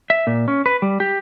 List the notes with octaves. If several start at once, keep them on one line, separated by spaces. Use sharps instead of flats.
E5
A#2
C#4
B4
G3
G4